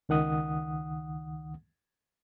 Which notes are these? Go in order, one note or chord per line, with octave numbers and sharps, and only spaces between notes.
C#2 D#3 F#5 D#6